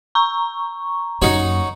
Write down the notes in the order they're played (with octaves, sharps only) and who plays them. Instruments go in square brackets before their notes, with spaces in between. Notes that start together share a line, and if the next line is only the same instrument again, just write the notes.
[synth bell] A#5 C#6
[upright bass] F#2 A#3 [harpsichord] D#4 F#4 C#5